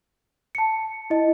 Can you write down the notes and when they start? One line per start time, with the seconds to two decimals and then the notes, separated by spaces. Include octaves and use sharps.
0.55 A5 C#7
1.10 E4 D#5